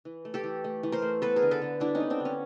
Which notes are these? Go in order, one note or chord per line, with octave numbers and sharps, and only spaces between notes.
E3
A3
G4 A4
E3
A3
E3
A#4 C5
A3
B3 A4 B4
G#4 A#4
D3
A4 B4
D3
G3 D4 E4
C#4 D#4
B3
C4 D4
D3
C#4